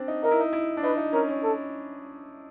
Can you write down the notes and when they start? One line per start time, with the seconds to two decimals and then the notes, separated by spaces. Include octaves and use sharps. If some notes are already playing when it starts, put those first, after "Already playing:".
Already playing: C4 D4
0.08 D#4
0.24 D#4 A#4
0.31 E4
0.40 D#4
0.53 E4
0.77 D4
0.84 D#4 B4
0.98 D#4
1.13 C#4 A#4
1.29 C#4
1.43 A4